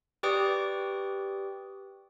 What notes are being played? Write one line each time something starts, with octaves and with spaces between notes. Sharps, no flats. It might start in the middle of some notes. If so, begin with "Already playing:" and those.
G4 B4 D5 G5 C#6 D#6